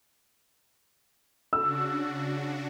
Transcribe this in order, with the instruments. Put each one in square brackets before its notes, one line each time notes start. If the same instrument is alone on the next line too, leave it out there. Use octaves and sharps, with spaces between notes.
[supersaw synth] C#3 D4 F#4 [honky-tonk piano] E6